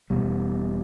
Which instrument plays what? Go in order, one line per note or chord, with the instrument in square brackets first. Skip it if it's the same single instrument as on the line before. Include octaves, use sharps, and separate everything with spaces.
[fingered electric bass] E1 E2 B2 G3